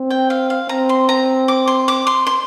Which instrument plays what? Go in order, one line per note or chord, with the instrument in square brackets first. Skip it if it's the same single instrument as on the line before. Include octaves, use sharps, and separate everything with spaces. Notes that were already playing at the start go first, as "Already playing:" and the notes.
Already playing: [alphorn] C4
[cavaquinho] G5
F5
F5
[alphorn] C4 [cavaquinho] A#5
[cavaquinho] C6
A#5
D6
C6
D6
C6
C6